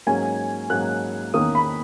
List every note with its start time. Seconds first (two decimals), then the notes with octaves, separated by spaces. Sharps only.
0.07 G#2 F#3 A#3 C#4 G#5
0.70 G#2 F#3 A#3 C#4 F#6
1.34 E2 D#3 A#3 C#4 D#6
1.55 B5